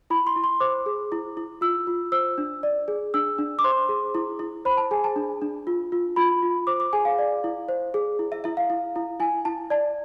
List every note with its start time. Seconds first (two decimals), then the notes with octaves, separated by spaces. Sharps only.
0.10 E4 B5
0.27 C6
0.36 E4
0.44 C6
0.60 C5 D6
0.86 G#4
1.12 E4
1.37 E4
1.61 F4 E6
1.87 F4
2.12 C5 E6
2.38 D4
2.63 D5
2.88 G#4
3.14 D4 E6
3.38 D4
3.59 D6
3.64 C5 C6
3.89 G#4
4.15 E4
4.39 E4
4.65 C5 B5
4.77 A5
4.91 G#4 G#5
5.04 A5
5.16 D4
5.41 D4
5.67 F4
5.92 F4
6.16 F4 B5
6.42 F4
6.67 C5 D6
6.80 D6
6.93 G#4 G#5
7.05 F5
7.19 D5
7.44 E4
7.69 C5
7.94 G#4
8.19 E4
8.32 E5
8.44 E4 E5
8.57 F5
8.70 E4
8.96 E4
9.20 E4 G#5
9.45 E4 A5
9.70 D5 A5